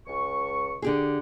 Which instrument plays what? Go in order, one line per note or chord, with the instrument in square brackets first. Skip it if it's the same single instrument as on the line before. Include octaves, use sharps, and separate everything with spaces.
[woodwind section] C#2 C#6
[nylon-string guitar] D3 G4 G#4